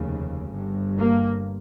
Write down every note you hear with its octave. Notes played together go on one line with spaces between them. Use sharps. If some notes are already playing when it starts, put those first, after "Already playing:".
Already playing: F1 D#2 C#3
G1 G2
A#3